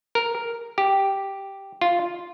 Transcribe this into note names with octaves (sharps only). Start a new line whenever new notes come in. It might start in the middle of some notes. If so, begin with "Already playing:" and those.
A#4
G4
F4